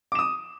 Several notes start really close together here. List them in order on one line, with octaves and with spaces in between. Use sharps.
D6 E7 D#6